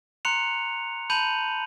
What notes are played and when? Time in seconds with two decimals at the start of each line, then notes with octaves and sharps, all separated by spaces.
0.25 A#5 C6 F#6 C#7 F7
1.10 A5 B5 G6 D#7 F7 F#7